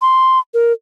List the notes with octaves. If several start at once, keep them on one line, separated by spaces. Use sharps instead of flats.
C6
A#4